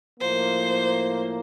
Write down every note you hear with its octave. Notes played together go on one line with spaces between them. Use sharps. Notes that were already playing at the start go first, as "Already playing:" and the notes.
A2 F3 A#3 C5